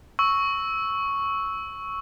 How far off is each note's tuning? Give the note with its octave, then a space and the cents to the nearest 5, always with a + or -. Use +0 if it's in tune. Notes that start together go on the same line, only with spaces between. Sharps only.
C#6 +0 E6 -10